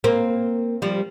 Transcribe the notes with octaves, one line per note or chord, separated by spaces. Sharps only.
A#3 C4
F3 G3